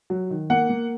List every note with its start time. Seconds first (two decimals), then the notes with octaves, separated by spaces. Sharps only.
0.10 F#3
0.30 D#3
0.50 A#3 F#5
0.70 A#3